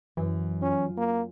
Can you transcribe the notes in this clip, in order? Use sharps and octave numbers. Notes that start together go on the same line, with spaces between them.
F#2 E3
C#4 F4
A#3